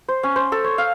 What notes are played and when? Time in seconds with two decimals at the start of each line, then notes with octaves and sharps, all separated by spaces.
0.08 C5
0.23 C#4
0.36 C5
0.52 A4
0.64 C#5
0.78 F5